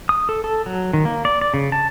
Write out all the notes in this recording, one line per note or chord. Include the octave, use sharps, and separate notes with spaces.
D#6
A4
A4
F#3
D#3
A#3
D5
D5
C#3
A5